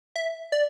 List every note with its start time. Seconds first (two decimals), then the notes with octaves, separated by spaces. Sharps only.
0.16 E5
0.52 D5